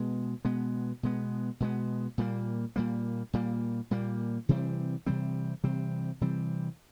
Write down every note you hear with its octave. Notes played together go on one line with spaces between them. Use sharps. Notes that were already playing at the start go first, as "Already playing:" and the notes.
Already playing: B2 G#3 B3
B2 G#3 B3
B2 G#3 B3
B2 G#3 B3
A#2 G3 A#3
A#2 G3 A#3
A#2 G3 A#3
A#2 G3 A#3
C3 E3 G3 C4
C3 E3 G3 C4
C3 E3 G3 C4
C3 E3 G3 C4